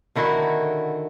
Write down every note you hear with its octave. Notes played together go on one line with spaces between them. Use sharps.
D3 D#3 E4 F#4